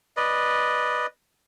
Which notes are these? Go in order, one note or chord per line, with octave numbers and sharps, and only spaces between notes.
B4 D5 D#5